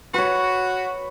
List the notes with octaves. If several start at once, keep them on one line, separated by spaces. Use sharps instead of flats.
F#4 B4 C#5